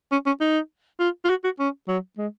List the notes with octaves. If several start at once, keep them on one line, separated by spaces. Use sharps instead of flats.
C#4
C#4
D#4
F4
F4
F#4
F#4
C#4
F#3
G#3